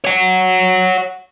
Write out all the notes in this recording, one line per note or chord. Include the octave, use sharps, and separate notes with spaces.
C#5 F#5